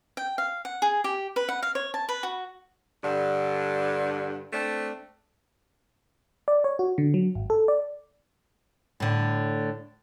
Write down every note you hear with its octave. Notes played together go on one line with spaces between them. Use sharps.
G5
F5
F#5
G#4
G4
B4
F#5
F5
C#5
A5
B4
F#4
G2 D3
A3 C4 D4
D5
C#5
F#4
D3
F#3
G#1
A4
D5
A2 D3